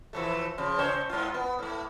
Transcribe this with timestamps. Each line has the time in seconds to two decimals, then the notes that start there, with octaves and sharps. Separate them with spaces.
0.13 E3 F3 A3
0.58 C#3 F3
0.78 C#3 C5 C#5
1.09 G#2 F4
1.34 B3
1.59 A2 A3